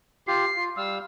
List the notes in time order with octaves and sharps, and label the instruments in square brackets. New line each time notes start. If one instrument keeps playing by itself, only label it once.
[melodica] F4 G4 [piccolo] C7
[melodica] F4
[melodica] G3 F5 [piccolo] E6